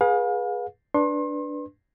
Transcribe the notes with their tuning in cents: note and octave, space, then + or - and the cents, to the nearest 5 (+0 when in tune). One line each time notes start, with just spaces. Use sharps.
G#4 +0 B4 -25 F5 +40
D4 +0 B4 +0 C6 +35